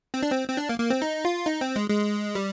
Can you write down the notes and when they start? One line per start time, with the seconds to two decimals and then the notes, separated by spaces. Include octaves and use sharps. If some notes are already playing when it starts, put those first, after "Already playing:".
0.14 C4
0.23 D4
0.31 C4
0.49 C4
0.57 D4
0.69 A#3
0.80 A#3
0.90 C4
1.02 D#4
1.25 F4
1.46 D#4
1.61 C4
1.76 G#3
1.90 G#3
2.35 G3